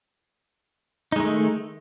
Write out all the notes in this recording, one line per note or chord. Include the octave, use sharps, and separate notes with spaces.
D#3 G#3 A3 D#4